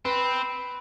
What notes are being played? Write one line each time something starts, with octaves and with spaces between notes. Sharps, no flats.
C4 B4 B5